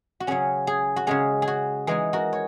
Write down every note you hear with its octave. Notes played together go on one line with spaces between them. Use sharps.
F#4
C#3 F#3 C#4 G#4
G#4
F#4
C#3 G#3 C#4 G#4
G#4
F#4
E3 G#3 D#4 G#4
F#4 A#4
C#5